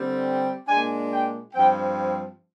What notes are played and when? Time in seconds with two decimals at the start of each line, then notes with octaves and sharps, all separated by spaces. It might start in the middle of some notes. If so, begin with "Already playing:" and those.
Already playing: D3 G3 C4
0.67 A#2 G#3 D4 G#5
1.11 G5
1.54 G2 F3 C4 G5